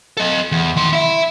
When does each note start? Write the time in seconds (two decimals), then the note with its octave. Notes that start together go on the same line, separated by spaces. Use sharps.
0.17 A4 D#5
0.52 E2
0.76 D#3 C6
0.93 E4 E5